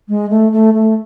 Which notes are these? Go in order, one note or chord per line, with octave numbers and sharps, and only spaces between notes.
G#3
A3
A3
A3